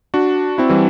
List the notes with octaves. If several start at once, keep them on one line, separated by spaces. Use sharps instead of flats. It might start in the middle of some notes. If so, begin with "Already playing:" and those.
D4 F#4
C4 E4
E3 G3